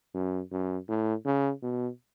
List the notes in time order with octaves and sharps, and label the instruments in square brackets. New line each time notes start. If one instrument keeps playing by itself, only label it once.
[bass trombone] F#2
F#2
A2
C#3
B2